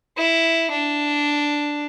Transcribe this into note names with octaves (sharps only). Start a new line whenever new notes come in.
E4
D4